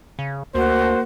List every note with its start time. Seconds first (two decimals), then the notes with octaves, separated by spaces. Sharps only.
0.19 C#3
0.55 D2 A#3 F#4 C5